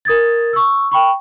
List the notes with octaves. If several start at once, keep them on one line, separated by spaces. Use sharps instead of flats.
A#4 D#6 G#6 A6
C#6 E6
G5 B5 C#6